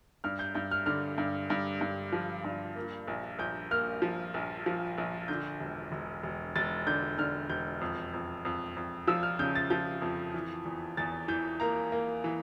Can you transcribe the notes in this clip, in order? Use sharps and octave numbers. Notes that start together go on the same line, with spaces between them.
G2 F6
G6
G2 G6
F6
D3 F6
G2
G2
G2
F3
G2
A#3
A#1
A#1 G6
A#3 F6
F3
A#1
F3
A#1
D3 G6
E1
E1
E1
E1 A6
D3 G6
D3 F6
E1 G6
F2
F2
F2
F2
F3 E6
F6
C#3 G6
A6
F3 G6
F2
E3
E2
E2 A6
E3 G6
A#3 A#5
A#3
E3